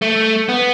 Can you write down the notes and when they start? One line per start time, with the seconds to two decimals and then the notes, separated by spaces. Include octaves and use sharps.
0.02 A3
0.49 B3